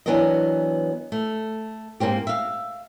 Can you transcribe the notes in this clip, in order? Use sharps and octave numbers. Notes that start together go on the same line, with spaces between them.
E3 F#3 B3 D4 A#4 D#5
A3
G#2 A#3 C4 G4
E5 F5